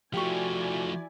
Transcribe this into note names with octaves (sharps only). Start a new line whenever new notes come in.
F3 A3 E4 F#4 G4 D5 G#5 C#6